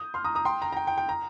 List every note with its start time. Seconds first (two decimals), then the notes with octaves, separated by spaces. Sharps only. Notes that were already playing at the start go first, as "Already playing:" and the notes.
Already playing: D#6 G6
0.14 C6 F6
0.24 A#5 D#6
0.35 A#5 D#6
0.45 G5 C6
0.62 A#5
0.72 A#5
0.77 G5
0.87 G5
0.98 G5
1.09 A#5